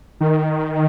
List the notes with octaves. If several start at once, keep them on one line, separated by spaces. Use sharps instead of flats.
D#3